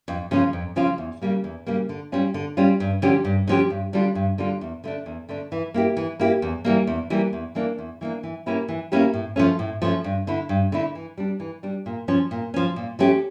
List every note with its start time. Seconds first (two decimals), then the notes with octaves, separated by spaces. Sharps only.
0.08 F2
0.31 C#3 F3 C#4 F4
0.53 F2
0.76 C#3 F3 C#4 F4
0.98 E2
1.22 C#3 G3 A#3
1.44 E2
1.67 C#3 G3 A#3
1.89 D3
2.12 G3 C#4 F4
2.34 D3
2.57 G3 C#4 F4
2.80 G2
3.02 D3 F3 C#4 G4
3.25 G2
3.48 D3 F3 C#4 G4
3.70 G2
3.93 D3 G3 D4 F4
4.15 G2
4.38 D3 G3 D4 F4
4.61 E2
4.84 D3 A3 D4
5.06 E2
5.29 D3 A3 D4
5.52 E3
5.74 A#3 E4 G4
5.97 E3
6.20 A#3 E4 G4
6.42 E2
6.65 E3 G3 A#3
6.87 E2
7.10 E3 G3 A#3
7.33 E2
7.55 E3 A#3 D4
7.78 E2
8.01 E3 A#3 D4
8.23 E3
8.46 A#3 C#4 E4 G4
8.69 E3
8.92 A#3 C#4 E4 G4
9.14 A2
9.36 F3 A3 C#4
9.59 A2
9.82 F3 A3 C#4
10.04 G2
10.27 D3 A3 E4
10.49 G2
10.72 D3 A3 E4
10.95 E3
11.18 G3 D4
11.40 E3
11.63 G3 D4
11.86 A#2
12.08 F3 C#4
12.31 A#2
12.54 F3 C#4
12.76 A#2
12.99 F3 A3 C#4 G4